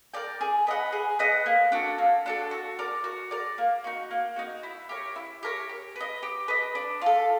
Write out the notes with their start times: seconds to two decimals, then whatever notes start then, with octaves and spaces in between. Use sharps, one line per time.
0.14 A#4 D5 G5
0.41 G#4
0.67 B4 D#5 F#5
0.92 G#4
1.19 B4 D#5 F#5
1.46 A#3
1.72 D4 F#4 A4
1.98 A#3
2.26 D4 F#4 A4
2.51 F#4
2.79 A#4 D5
3.04 F#4
3.31 A#4 D5
3.58 A#3
3.84 D#4 F#4
4.11 A#3
4.36 D#4 F#4
4.63 E4
4.89 G4 A#4 C#5
5.16 E4
5.43 G4 A#4 C#5
5.69 G4
5.96 B4 D#5
6.23 G4
6.48 B4 D#5
6.75 D4
7.02 F4 A4